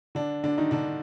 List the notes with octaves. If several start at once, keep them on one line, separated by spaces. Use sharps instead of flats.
D3 D4
D3 D4
D#3 D#4
D3 D4